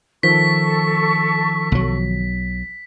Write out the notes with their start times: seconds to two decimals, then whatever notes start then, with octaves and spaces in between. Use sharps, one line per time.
0.23 D#3 F3 A4 C#6 B6
1.72 B1 F#3